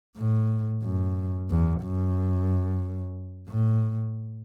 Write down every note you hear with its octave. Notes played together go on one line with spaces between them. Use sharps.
A2
F#2
E2
F#2
A2